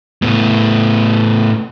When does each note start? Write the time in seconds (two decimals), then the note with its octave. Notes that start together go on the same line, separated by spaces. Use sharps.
0.22 A2 B3